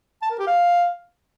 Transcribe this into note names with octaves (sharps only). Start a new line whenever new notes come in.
A5
A#4
G4
F5